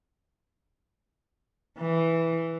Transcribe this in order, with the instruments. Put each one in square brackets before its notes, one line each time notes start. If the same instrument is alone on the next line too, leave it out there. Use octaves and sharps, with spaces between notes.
[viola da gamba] E3